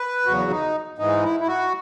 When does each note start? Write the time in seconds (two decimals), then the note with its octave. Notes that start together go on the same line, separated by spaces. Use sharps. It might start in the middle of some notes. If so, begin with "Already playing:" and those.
Already playing: B4
0.26 E2 C#3 F#3 F#4
0.51 D#4
0.98 G#2 E3 G#3 D#4
1.23 E4
1.40 E4
1.47 F#4